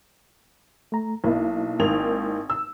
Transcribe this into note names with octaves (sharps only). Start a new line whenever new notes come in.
A3 A#5
B1 A#3 D#4 E4
G#1 D#3 F7
E6